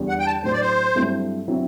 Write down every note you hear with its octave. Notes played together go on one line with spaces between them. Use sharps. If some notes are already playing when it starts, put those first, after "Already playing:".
Already playing: E2 D3 G3
F#5
G5
A5
A2 F#3 A3 D4 C5
D5
C5
G2 F#3 A3 C4 E4
D3 F#3 C4 E4